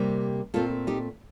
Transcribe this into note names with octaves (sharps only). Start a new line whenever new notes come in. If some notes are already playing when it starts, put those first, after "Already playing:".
Already playing: C3 G3 A#3
A#2 A3 C4 F4 A4
D#4 G4